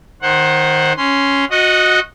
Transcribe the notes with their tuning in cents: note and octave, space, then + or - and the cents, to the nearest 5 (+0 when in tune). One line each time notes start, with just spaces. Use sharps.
D#3 +0 C5 +20 F#5 +0
C#4 +0 C6 -10
F#4 -20 D#5 +0 F#5 +0